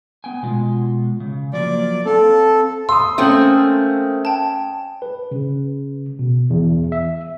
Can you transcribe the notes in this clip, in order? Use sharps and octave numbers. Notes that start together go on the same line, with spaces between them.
B3 G5 G#5
B2 G#3 F4
C#3
F3 F#3 A#3 D5
C4 A4 F5
C6 D#6 E6
A3 A#3 C4 C#4 D#6 F#7
G5 A5
B4
C#3
B2
E2
E5